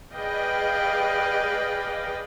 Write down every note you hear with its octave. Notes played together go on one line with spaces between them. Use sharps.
G#4 B4 D5 D#5 F5 G5